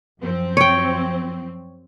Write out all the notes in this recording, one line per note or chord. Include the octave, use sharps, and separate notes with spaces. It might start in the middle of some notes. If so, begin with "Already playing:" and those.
F#2 F3 C4
C#5 G5